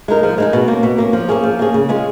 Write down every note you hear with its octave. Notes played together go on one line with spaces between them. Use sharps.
G#3 D#4 A#4
F3
G#3 D#4 A#4
B2
A#3 C#4
B2
A#3 C#4
F3
A#3 C#4 G#4
F3
A#3 C#4 G#4
C#3
G#3 C#4 F4 G#4